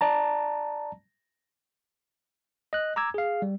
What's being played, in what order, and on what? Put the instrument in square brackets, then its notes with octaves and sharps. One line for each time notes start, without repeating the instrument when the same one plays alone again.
[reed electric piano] D5 A5 A#5
[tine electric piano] D#5 F#6
A#5 D6 E6 G#6
G#4 F5
G3